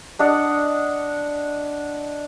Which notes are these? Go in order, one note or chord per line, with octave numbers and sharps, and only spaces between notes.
D4 D#5 F#5